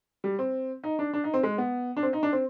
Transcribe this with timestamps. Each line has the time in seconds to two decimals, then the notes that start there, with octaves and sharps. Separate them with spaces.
0.24 G3
0.39 C4
0.84 D#4
0.99 D4
1.14 D4
1.24 D#4
1.34 C4
1.43 G#3
1.58 B3
1.97 D4
2.03 C4
2.13 D#4
2.23 D4
2.33 C4